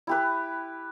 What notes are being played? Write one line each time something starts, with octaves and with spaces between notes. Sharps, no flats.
E4 G4 B4